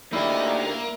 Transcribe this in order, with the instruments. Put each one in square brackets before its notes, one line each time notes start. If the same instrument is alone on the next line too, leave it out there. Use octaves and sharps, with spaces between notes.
[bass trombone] D2 [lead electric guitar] A#3 [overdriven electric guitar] D#4 G4 [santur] E4 D5